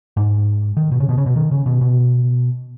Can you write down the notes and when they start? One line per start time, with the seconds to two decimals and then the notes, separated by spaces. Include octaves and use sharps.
0.17 G#2
0.77 D#3
0.92 B2
1.00 C#3
1.09 B2
1.18 C#3
1.26 B2
1.36 D#3
1.51 C#3
1.66 B2
1.81 B2